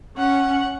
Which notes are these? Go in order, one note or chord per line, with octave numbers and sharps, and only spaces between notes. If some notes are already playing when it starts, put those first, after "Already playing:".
C#4 F#5